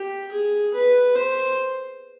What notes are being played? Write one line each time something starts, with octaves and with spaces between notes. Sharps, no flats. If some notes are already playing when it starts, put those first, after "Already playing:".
Already playing: G4
G#4
B4
C5